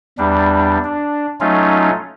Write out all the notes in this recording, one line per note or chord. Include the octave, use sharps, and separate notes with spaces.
E2 G3 D4
D4
F#3 A3 C#4 D#4 F4